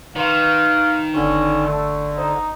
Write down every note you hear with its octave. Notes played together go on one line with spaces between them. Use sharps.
D#3 B4 F5 C6 C#6
G1 D3 C#4 D4 C#6
A3
D#4 C5